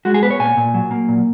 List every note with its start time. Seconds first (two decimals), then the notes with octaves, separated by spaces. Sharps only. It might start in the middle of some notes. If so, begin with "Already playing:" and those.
0.05 G#3 F#4
0.14 G#4
0.23 B3 B4
0.30 C#5
0.40 A#2 G#5
0.57 A#2
0.74 F#3
0.91 A#3
1.08 A#2